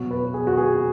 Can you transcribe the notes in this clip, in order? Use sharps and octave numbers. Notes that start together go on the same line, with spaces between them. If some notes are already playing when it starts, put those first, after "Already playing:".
Already playing: B2 F#3 F#4
B4
G#4
F#4
G#4